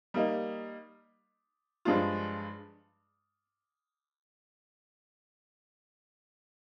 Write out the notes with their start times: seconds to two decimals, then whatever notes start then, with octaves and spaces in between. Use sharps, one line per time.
0.14 G3 A#3 D#4
1.85 G2 F3 G#3 D4 F4